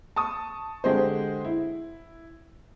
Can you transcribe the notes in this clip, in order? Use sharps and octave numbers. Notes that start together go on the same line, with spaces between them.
A5 C#6 D#6
D3 G#3 G4 G#4 C5
E4